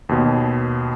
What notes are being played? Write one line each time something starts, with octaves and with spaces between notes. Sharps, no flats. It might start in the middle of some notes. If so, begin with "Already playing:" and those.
D#2 B2